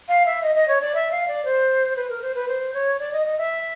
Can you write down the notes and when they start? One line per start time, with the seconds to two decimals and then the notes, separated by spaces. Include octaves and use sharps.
0.09 F5
0.26 E5
0.43 D#5
0.55 D#5
0.68 C#5
0.81 D5
0.95 E5
1.11 F5
1.28 D5
1.45 C5
1.96 B4
2.10 A#4
2.22 C5
2.35 B4
2.48 C5
2.74 C#5
3.00 D5
3.13 D#5
3.26 D#5
3.38 E5